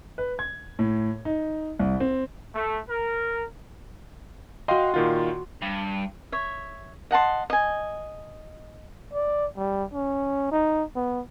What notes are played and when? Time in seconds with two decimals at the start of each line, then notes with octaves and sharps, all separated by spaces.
0.18 B4
0.39 G#6
0.79 A2
1.25 D#4
1.79 C2
2.00 C4
2.55 A3
2.90 A#4
4.68 F#4 D#5 F5 G5 C6
4.94 A#2 D#3 F4
5.62 G2
6.32 C#5 E5
7.11 D#5 F#5 A5 C6
7.50 D#5 G#5
9.13 D5
9.57 G3
9.94 C#4
10.52 D#4
10.95 B3